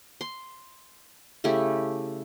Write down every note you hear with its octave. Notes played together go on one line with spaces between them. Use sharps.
C6
C#3 A3 E4 G4